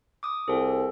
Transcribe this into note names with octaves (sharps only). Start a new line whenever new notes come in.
D6 D#6
C2 G#4 A4